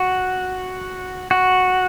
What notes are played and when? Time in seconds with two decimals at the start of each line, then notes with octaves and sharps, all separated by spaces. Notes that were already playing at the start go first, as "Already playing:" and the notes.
Already playing: F#4
1.31 F#4